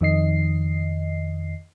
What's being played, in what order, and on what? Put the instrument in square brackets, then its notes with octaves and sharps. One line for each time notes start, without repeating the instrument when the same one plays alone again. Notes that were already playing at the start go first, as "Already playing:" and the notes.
[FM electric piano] F2 D#3 D#5 C7